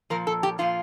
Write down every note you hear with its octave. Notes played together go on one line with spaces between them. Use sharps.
A#2 F3 A#4
A4
G4
A#2 F3 F4